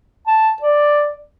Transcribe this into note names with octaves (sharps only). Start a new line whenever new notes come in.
A5
D5